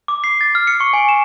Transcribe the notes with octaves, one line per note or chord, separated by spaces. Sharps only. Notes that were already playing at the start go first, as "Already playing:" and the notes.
D6
C7
A6
F6
C#7
C#6
G#5
E7